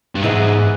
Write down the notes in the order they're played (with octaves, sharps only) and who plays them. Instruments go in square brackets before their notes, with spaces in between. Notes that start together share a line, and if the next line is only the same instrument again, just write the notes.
[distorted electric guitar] G2
[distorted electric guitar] G#2 [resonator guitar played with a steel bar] E3 G#3 B3